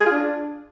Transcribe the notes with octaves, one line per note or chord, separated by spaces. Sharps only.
G#4
F4
D4